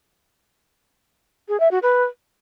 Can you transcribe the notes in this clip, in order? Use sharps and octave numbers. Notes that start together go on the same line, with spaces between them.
G#4
E5
F#4
B4